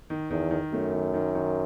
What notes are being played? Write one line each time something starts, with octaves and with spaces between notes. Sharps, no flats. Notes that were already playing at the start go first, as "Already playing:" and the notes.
D#3
E2 D#3
D#3
F#2 A3
D#3
D#3
D#3